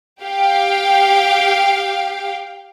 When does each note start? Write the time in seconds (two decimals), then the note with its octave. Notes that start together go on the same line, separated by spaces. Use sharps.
0.22 G4 F5 G5